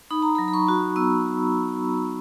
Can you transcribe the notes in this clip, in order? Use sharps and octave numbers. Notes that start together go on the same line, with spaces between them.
D#4 B5
A#5
F#3 B5
B5
C#6
F#4
B3 E6